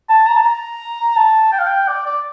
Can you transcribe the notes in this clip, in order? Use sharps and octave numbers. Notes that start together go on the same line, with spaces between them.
A5
A#5
A5
A#5
A5
G5
F5
G5
D5
D5